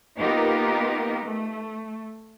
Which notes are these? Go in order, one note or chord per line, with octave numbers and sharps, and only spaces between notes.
A#3 B3 D#4 F4 G4 A#4
A3